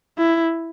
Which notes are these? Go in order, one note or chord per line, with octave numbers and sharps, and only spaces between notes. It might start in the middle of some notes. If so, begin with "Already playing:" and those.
E4